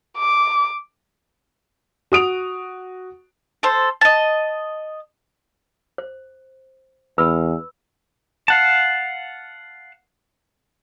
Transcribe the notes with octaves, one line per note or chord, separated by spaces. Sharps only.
D6
F#4 D#6 D7 F7
A4 C5
D#5 A5
C5
E2 B4 B5 E6
F5 F#5 A5